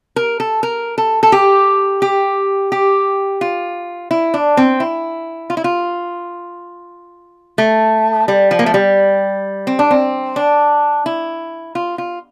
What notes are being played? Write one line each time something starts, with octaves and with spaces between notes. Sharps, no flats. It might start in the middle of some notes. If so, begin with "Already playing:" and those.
A#4
A4
A#4
A4
A4
G4
G4
G4
F4
E4
D4
C4
E4
F4
E4
F4
A3
G3
F3
A#3
A3
G3
C4
D4
C4
D4
E4
F4
F4